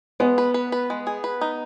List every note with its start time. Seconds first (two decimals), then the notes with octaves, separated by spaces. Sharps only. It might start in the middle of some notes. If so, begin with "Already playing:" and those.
0.20 G#3 B3
0.38 B4
0.54 B4
0.72 B4
0.90 G#3
1.07 G#4
1.24 B4
1.41 D#4